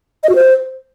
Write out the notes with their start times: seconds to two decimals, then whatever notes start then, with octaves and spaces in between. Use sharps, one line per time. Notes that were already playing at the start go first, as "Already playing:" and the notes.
0.24 D#5
0.29 F#4
0.35 C5